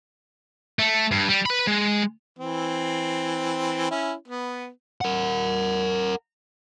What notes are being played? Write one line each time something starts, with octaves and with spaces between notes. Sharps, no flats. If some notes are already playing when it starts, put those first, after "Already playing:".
A3
G2
G3
B4 B5
G#3
E3 C4
C#4 E4
B3
A#4 F#5